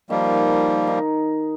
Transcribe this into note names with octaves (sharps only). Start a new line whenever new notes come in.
D#3 F3 G3 A#3
D#4